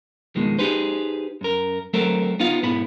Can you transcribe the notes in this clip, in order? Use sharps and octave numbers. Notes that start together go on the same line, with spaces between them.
F2 B2 D#3 G#3
D#4 G4 G#4 B4 C5
F#2 A#4
F#3 A3 C4 A4 A#4
B3 D#4 F4 F5
B1 G#2 B3 E4 B5